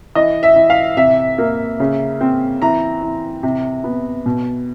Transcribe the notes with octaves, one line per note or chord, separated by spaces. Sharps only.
E3 D#5
E5
E3
F5
C3 E5
A#3
C#3
C4
E3 A#5
E3
C3
B3
B2